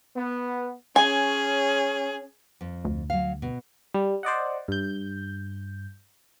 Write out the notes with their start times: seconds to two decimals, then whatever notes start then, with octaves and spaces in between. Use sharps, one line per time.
0.16 B3
0.96 C#4 G#4 G#5
2.61 F2
2.85 D2
3.10 F#3 F5
3.42 B2
3.94 G3
4.23 C5 D5 D#5 F#5
4.68 G2 G6